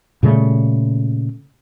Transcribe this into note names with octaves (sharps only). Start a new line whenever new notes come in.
A#2 C#3 G3 A3